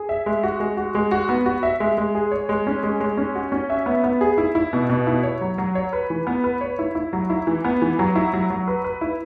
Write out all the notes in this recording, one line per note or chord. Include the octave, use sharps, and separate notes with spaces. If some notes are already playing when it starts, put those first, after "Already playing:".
Already playing: G#4
E5
G#3
F#4
G#3
F#4
G#3
F#4
B3
F#4
E5
G#3
G#3
G#4
C#5
G#3
C#4
G#3
G#3
C#4
F#4
C#4
E5
B3
B3
G#4
E4
E4
B2
B2
E4
C#5
F#3
F#3
C#5
B4
E3
B3
B4
C#5
E4
E4
F#3
E4
E3
B3
E3
F#3
E4
F#3
F#3
B4
B4
E4